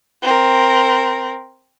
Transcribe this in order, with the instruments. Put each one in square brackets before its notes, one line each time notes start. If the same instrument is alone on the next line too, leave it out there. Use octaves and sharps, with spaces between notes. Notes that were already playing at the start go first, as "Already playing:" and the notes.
[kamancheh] C4 A#4